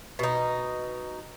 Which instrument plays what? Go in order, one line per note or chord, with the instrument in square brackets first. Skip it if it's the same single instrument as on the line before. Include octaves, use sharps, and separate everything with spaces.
[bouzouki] B2 D#4